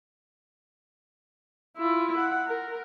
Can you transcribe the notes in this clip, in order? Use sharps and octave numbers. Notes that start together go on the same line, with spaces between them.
E4 F4
F#5
A#4